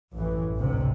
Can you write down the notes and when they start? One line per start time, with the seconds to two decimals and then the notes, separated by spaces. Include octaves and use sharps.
0.14 A1 F#2 E3
0.56 A1 D2 G#2 C3